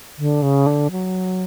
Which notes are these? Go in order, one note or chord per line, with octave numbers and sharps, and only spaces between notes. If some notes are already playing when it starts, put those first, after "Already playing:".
D3
C#3
D3
F#3